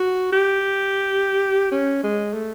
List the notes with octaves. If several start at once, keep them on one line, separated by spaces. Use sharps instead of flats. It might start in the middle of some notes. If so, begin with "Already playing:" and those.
Already playing: F#4
G4
C#4
G#3
A3